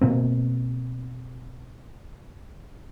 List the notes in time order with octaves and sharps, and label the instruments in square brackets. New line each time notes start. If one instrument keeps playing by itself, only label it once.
[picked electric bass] B2 A#3 C4